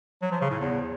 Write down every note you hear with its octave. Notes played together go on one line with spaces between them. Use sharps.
F#3
F3
C#3
A2
E2